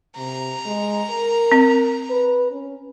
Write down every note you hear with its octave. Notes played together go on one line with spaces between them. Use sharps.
C3 A#5
G#3
A#4
C4
B4
C#4